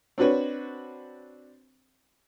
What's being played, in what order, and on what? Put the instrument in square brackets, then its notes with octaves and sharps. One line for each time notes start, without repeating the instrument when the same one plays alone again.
[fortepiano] C4 D4 F#4 B4 C#5